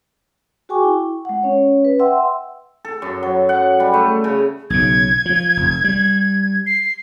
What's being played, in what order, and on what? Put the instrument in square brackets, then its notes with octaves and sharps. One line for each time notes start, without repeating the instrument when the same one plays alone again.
[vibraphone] F#4 G#4 G5 G#5 C#6 D6
E4
G#3 F#5
C#4 C#5
B4
E5 F#5 G5 C6 E6
[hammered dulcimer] A4
F#2
F#3
F#5
G3
A3
C#3
[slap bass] B1 C#3 [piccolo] G#6
[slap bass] F3
F1
G3
[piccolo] C7